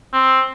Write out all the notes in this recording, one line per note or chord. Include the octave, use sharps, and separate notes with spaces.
C4